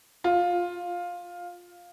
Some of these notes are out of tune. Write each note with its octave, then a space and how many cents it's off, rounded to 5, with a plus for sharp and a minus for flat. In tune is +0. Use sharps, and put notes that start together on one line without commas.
F4 +10